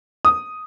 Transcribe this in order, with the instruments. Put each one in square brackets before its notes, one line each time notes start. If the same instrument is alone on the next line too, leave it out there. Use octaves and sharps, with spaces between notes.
[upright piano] D#6